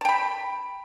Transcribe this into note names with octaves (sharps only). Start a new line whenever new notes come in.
G5 A5 B5